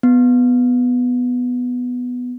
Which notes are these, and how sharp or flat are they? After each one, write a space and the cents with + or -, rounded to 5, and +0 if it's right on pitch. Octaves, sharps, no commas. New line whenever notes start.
B3 +5